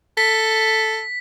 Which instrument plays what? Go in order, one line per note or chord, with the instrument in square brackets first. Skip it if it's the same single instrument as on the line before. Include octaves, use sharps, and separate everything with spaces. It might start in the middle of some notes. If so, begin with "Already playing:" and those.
[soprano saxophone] A4 [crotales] B6